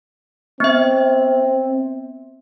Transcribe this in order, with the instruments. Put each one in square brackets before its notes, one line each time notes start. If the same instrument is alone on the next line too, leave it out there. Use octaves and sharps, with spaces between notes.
[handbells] B3 E5 [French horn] C4